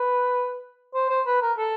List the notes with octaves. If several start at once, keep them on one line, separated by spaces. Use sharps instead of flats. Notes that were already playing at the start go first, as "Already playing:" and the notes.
Already playing: B4
C5
C5
B4
A#4
A4